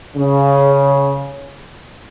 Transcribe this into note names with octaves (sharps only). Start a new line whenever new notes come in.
C#3